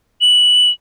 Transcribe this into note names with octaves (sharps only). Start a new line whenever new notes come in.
F#7